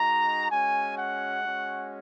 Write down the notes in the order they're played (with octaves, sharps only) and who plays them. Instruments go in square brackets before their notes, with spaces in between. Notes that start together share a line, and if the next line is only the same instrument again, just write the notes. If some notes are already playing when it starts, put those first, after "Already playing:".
Already playing: [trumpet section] G#3 D#4 F#4 A#5
G#3 C#4 F#4 G#5
F#5
G#3 C#4 F#4